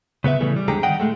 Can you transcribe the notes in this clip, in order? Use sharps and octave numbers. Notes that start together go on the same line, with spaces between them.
C#3 B3 B4 E5
A2 C#3 E3 G3 A3
G3
E2 G#2 D3 G4 G#4 A#5
D#3 G3 D#5 F#5 G5
A2 G#3 A3